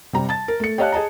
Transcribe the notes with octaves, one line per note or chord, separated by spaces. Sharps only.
C3 G3 A#5
A5 A6
A#4
A3 C#7
G4 C#5 D#5 F5 A5 F#6
G#4 D#5 A5 A#5